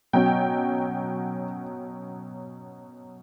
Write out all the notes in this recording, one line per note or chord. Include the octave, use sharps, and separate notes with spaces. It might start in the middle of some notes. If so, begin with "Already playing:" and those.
B2 F#3 C#4 G5